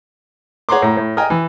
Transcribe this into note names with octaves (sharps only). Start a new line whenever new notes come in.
G#4 C#5 F#5 A#5 C6 D6
A2 A#5
A2
D#5 G5 G#5 A#5 D#6 F6
E3